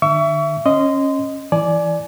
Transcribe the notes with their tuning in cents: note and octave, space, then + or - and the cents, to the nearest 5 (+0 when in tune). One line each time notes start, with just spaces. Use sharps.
D3 +45 E5 +20 C#6 +35
C#4 -20 D#5 +0 C6 -20
E3 +10 D5 +0 G#5 +25